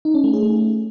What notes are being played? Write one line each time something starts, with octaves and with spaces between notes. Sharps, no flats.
D#4
C#4
A3
G#4
A3